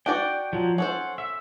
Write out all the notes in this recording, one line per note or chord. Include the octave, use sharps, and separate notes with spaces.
D4 F#4 D5 G5
F3 F#3
C#4 A4 C5 F#5
E5